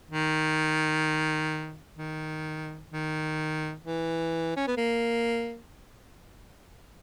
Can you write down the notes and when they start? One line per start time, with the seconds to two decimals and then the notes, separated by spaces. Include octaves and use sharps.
0.11 D#3
1.97 D#3
2.91 D#3
3.84 E3
4.57 C#4
4.67 B3
4.77 A#3